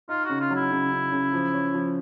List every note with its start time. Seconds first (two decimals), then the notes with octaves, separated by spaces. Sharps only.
0.09 D#4 F4
0.25 C#3 F#4
0.40 F4
0.50 F#3
0.56 E4
0.71 C#3
0.92 C#3
1.12 C#3
1.33 F3
1.54 C#4
1.74 F3